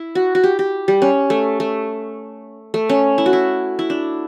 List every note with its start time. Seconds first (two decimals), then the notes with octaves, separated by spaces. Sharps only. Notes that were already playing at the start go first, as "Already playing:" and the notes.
Already playing: E4
0.15 F#4
0.35 F#4
0.44 G4
0.59 G4
0.88 G3
1.02 C#4
1.30 A3
1.60 A3
2.74 A3
2.89 C#4
3.18 E4
3.26 F#4
3.33 E4
3.79 E4
3.90 D4